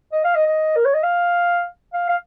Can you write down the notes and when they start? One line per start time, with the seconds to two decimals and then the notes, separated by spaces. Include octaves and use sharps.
0.13 D#5
0.25 F5
0.35 D#5
0.47 D#5
0.76 A#4
0.85 C#5
0.94 D#5
1.03 F5
1.93 F5
2.09 F5